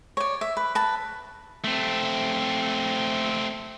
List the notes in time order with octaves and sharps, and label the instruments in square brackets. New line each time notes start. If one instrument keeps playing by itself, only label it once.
[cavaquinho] C#5 D5
E5
B4
B4 A5
[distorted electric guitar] A3 C4